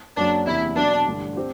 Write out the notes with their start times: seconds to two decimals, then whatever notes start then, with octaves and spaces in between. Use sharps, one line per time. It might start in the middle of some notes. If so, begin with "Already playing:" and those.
0.16 F#1 F#2 F#3 D4
0.47 F#1 E2 C3 E4
0.76 B2 F#3 B3 D4
1.07 A1 G2 D3
1.36 C4 G4 C5